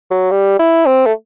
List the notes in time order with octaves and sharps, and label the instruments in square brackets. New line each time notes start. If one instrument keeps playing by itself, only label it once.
[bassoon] F#3
G3
E4
C4
A3